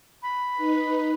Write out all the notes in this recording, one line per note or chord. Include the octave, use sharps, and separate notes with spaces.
B5
D#4 B4